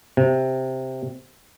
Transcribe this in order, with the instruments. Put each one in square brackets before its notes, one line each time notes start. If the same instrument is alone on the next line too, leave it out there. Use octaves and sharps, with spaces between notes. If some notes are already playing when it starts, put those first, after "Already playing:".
[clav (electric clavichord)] C3